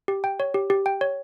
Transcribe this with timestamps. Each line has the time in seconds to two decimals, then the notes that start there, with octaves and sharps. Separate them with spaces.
0.08 G4
0.24 G5
0.40 C#5
0.54 G4
0.70 G4
0.86 G5
1.01 C#5